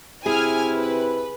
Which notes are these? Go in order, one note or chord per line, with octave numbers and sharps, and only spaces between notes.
C3 E4 G#4 G#5 F6
B4